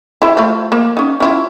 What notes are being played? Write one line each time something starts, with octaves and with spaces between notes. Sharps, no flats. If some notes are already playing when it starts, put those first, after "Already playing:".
E4 E5
F3 A3
A#3
C#4 D#4
C#4 E4 F4